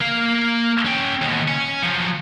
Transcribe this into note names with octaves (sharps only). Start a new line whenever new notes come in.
A#3 F5
C#4 G5
D#2 B2
C#4
F3 F#3